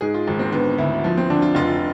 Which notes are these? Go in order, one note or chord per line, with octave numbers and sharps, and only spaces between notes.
G#2 G#4
F4
G#1
C4
D3 B3
D2 E4
F3
C4
D3 D4
F4
F1 F4